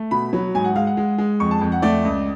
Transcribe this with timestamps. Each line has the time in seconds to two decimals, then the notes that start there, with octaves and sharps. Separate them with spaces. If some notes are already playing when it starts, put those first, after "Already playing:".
Already playing: A3
0.11 B2 B5
0.33 F#3
0.55 G#2 G#5
0.64 F#5
0.76 G#3 F5
0.87 F#5
0.97 G#3
1.18 G#3
1.40 F2 C#6
1.51 A5
1.61 F2
1.72 F#5
1.82 A3 D5
2.05 C#2